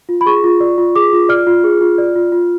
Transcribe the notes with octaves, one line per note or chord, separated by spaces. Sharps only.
F4
B5
G#4 C#6
F4
D5
F4
G#4 D6
F4
D5 F6
F4
G#4
F4
D5
F4
F4